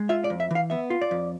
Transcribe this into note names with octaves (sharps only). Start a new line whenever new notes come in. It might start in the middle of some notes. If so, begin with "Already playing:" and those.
Already playing: G#3
F4 E5
D5
F2
E5
E3 F5
B3 E5
F4
D5
F2